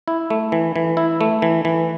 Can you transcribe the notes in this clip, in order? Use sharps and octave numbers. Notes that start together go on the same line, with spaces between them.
E4
A3
E3
E3
E4
A3
E3
E3